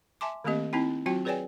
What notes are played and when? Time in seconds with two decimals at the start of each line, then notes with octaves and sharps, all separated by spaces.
0.21 E5 G#5 A5 C6 D6
0.44 D#3 A3 A#3 C4 G4 D#5
0.73 C4 D#4 E4 G5
1.06 F#3 C4 F4 F#4 G5
1.25 G#4 B4 C#5 D5 G5 G#5